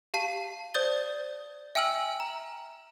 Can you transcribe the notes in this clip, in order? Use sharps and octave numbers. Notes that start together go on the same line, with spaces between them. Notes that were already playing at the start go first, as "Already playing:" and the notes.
G4 F5 A5 C7 D#7
C5 D5 D#6 G6 A6 G7
E5 G5 G#5 E6 F6 F#7
A#5